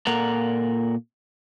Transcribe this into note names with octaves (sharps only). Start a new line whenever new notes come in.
A#2 A#3 A4 A#4 F#5 A#5